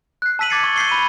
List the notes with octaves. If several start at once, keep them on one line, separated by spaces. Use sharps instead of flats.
F#6 C7
A5 E6 B6 D#7 F#7
D6 G#6 A6 C7 C#7
C#6
G6 B6 C7 G7
B5 D#7